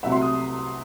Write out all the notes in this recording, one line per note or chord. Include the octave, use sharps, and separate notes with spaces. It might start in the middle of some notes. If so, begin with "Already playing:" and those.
C2 C3 F#3 A3 E5
C6
D#6